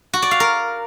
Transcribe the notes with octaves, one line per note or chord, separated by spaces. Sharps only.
F#4
D5
F5
A#4